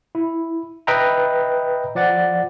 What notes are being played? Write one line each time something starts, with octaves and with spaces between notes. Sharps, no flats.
E4
B4 D#5 E5 G5 A#5
F3 D5 F#5 A6